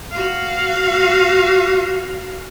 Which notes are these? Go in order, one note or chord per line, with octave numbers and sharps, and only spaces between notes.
F#4 F5